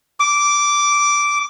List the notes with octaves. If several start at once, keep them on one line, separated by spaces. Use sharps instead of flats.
D6